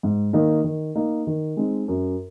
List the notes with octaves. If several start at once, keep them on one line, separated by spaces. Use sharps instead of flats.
G#2
D#3 A#3 D#4
D#3
A#3 D#4
D#3
G#3 C4 D#4
F#2